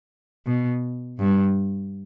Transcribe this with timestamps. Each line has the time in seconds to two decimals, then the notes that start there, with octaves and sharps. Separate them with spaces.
0.46 B2
1.20 G2